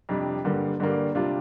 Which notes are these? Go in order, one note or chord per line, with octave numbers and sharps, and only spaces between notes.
F2 C3 G3 D4
G2 D3 G3 A#3
G2 D3 G3 A#3
C3 G3 D4 F4